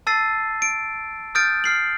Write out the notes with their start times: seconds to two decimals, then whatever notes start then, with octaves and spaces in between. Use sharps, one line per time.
0.07 A5 E6 A6 C7 D#7
0.62 D7
1.35 D#6 F6 G6 A6 D7
1.64 F6 C7 F#7